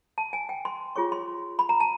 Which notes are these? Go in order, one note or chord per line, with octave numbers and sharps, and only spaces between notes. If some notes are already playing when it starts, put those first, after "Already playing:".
A5
G#5
G5
C6
F4 G#4 C#5 C#6
C6
B5
A#5
A5